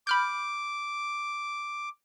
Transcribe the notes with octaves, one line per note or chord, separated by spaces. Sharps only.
B5 D6 F6 G6